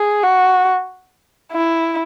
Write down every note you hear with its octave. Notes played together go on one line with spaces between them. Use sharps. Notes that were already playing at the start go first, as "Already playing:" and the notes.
Already playing: G#4
F#4
E4